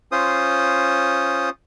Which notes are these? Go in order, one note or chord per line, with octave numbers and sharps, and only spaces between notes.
C#4 F4 C5 D#6